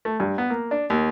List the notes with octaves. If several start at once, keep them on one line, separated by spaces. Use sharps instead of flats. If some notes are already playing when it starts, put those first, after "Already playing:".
A3
G2
B3
A#3
D4
D#2